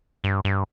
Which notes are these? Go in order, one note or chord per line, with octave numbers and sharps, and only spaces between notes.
G2
G2